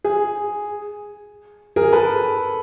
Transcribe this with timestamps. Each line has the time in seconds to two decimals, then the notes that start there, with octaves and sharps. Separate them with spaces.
0.04 G#4
1.76 G#4 A#4
1.93 A4 B4